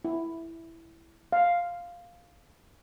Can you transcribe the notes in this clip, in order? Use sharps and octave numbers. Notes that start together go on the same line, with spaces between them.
E4
F5